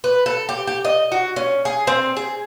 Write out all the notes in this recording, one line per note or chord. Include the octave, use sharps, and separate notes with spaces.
B4
A4
G4
G4
D#5
F#4
C#4
G#4
C4
G#4